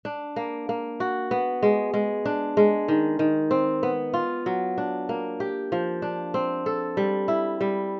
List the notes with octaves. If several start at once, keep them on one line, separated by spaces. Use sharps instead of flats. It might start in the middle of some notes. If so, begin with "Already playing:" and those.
D4
A#3
A#3
F#4
B3
G#3
G#3
D4
G#3
D#3
D#3
C4
B3
F4
F#3
D4
A#3
G4
F3
D4
C4
A4
G3
E4
G3